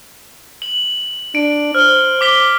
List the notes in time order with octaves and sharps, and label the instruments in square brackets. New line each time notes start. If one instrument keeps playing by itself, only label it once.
[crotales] F#7
[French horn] D4 [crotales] D7
[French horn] C5 [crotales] F6 G7
[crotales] D6 B6 G7